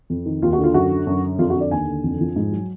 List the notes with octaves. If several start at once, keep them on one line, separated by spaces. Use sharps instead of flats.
F2
D#3
D#2 F4
F#4
D3
F4
F#2 F#4
D3
F#2
D3
F2 F4
F#4
D3
D5
D#2 G#5
D3
F2
F3
G#2
F#3